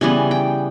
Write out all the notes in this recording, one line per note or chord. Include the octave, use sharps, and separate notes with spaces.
C#3 E3 G3 B3 G#5
G5